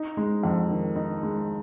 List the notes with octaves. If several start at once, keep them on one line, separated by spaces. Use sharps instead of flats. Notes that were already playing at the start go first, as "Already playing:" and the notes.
Already playing: D#4
G#3
F2
D#3
D#4
G#3